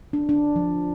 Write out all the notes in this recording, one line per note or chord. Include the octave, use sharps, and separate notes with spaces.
D4
D4
F3